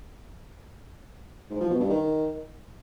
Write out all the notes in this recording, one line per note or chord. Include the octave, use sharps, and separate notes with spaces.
G#2
F3
B2
G2
D#3